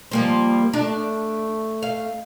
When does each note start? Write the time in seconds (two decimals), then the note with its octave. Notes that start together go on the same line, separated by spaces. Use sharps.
0.11 F3 G3 A#3 C5
0.73 A3 D4
1.82 F5